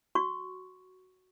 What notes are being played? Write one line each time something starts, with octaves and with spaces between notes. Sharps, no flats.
F#4 C#6